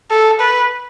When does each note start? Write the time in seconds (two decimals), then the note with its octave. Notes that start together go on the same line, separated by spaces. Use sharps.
0.11 A4
0.40 B4